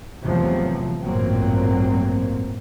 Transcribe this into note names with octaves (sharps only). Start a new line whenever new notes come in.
E2 A2 C3 F3 F#3
A1 G2 A#2 F#3 A#3 C4